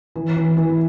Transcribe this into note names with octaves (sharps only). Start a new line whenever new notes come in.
E3
E3
E3